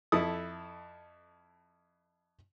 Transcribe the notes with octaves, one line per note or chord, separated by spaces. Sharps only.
F2 E4 A4 D#6